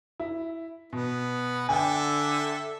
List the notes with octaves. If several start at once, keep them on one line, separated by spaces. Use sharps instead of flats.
E4
B2 B3
D3 A4 E5 G5 G#5